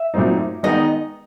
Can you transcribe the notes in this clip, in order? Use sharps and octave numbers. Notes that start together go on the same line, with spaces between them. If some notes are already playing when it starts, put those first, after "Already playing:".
Already playing: E5
A#2 F#3 A3 C4 D#4
D#3 G#3 B3 D#4 D#5